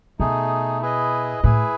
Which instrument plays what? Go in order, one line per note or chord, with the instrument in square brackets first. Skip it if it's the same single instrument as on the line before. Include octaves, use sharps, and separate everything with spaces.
[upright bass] B2 [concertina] A3 D#4 G#4
[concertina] E4 G#4 B4 D#5
[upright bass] A2 [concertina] E4 G#4 B4